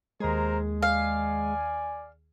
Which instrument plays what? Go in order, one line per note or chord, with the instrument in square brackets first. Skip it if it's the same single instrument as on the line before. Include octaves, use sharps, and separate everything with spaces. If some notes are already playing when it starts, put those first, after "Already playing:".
[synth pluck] D#2 G#4 [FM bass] G#3 [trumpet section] A#4 C5 A#5
[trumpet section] D5 G#5 [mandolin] F5